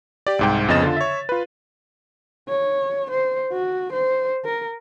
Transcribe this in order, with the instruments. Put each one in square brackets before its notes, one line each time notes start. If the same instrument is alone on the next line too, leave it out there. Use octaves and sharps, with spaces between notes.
[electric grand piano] G4 D5
C2 G#2 G5
F2 C#3 B3 D#5 A6 E7
D3 F4
C#5 E5
F4 B4
[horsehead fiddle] C#5
C5
F#4
C5
A#4